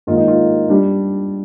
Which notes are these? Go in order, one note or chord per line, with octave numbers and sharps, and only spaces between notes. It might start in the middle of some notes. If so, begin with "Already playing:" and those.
G#2 D#3 A#3 D#4 F4
D#4
F4
G3 D4